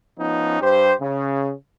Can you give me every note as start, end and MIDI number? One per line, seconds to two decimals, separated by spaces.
0.18 0.61 53
0.18 0.61 59
0.18 0.61 61
0.18 0.61 63
0.62 0.93 43
0.62 0.93 67
0.62 0.93 72
1.01 1.52 49